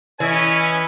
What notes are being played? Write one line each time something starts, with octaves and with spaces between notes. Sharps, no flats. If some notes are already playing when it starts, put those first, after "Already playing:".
E3 C#4 E4 B4 D#5 G#5